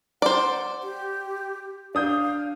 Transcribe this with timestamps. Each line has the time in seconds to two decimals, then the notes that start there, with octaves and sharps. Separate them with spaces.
0.22 C5 D5 F#5
0.83 G4
1.95 D4 F5 D#6 G6